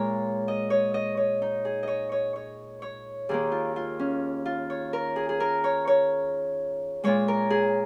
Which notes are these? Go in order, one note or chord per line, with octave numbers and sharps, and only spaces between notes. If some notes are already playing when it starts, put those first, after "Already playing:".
Already playing: A#2 G#3 A#4 C#5
D#5
C#5
D#5
C#5
D#4
G#4
C#5 D#5
C#5
C#5
C#5
D#2 D#3 A#3 G#4
F4
F4
C#4
F4
C#5
A#4
G#4
G#4
A#4
C#5
C#5
A#2 G#3 C#5
A#4
G#4